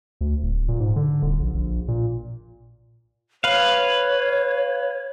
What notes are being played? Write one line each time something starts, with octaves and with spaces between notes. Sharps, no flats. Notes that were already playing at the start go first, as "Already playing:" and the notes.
D2
D1
A#2
G#2
D3
D#1
A#1
A#1
A#2
B4 C#5 F5